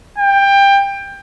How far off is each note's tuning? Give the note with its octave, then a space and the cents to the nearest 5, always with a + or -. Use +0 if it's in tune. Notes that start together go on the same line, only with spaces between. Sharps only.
G5 +20